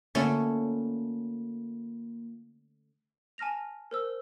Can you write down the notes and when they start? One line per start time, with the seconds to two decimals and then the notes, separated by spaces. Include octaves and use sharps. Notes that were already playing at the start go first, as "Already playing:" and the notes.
0.15 D3 A3 A#3 C#4 F4
3.38 G#5 A5 F6 A#6 F7
3.91 A#4 C5 E6